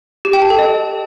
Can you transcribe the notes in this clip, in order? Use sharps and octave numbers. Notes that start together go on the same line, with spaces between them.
G4
G5
A5
A4
D#5